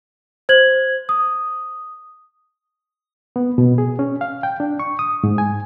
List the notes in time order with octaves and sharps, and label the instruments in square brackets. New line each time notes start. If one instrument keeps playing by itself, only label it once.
[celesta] C5 G#6 F#7
D#6
[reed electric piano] B3
B2
G#4
C#4
F5
G5
D4
C#6
D#6
G#2
G#5